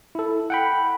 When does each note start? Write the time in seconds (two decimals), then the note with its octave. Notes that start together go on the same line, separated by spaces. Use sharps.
0.15 E4 A4
0.50 F#5 G5 B5